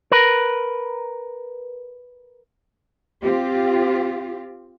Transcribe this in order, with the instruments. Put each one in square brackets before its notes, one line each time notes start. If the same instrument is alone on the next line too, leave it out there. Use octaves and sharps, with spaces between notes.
[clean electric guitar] A#4 B4
[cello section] C4 F4 G4